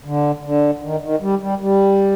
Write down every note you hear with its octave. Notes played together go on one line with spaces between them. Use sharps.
D3
D3
D#3
D#3
G3
G3
G3